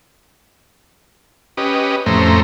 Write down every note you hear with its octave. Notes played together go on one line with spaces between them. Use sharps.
C#4 G4 B4 D#5
F2 A2 A3 C#4 C5 A#5